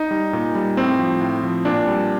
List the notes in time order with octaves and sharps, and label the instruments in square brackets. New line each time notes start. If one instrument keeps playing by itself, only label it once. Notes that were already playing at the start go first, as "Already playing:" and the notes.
Already playing: [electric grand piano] D#4
G3
A#2
G3
A2 C4
F3
A2
F3
A#2 D4
G3